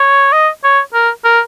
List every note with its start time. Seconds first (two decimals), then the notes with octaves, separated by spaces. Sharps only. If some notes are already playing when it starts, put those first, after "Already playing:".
Already playing: C#5
0.32 D#5
0.64 C#5
0.94 A#4
1.24 A#4